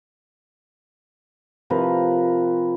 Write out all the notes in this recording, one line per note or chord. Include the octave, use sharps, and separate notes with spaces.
C3 F3 A#4 B4